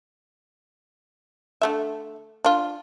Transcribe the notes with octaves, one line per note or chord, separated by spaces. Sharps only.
D3 A3 E5
D4 F4